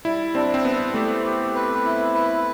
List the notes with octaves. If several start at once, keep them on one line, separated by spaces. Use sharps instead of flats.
G3 E4
C4 D4
C4
G3 B3
A3 G4
G4
B4
E4
B4